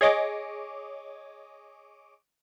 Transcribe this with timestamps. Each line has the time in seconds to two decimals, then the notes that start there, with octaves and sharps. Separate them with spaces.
0.01 G#4 C#5 D#5 D6